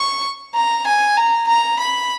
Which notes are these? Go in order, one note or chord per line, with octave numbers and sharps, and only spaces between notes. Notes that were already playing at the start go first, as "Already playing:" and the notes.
Already playing: C#6
A#5
G#5
A#5
A#5
B5